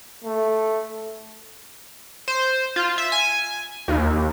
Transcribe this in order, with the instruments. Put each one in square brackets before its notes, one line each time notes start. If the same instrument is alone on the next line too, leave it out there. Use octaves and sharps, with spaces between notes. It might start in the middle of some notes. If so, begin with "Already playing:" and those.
[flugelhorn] A3
[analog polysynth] C5
F4
E5
G#5
D#2